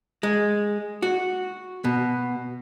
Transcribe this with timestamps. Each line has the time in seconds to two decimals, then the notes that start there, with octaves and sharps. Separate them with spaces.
0.23 G#3
1.02 F#4
1.84 B2